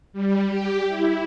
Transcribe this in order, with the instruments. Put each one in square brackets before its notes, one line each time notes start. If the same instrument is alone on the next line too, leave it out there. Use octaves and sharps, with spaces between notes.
[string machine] G3
G4
E4